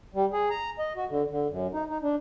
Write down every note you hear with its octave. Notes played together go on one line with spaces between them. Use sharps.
G3
G#4
A#5
D#5
F#4
D3
D3
F#2
D#4
D#4
D4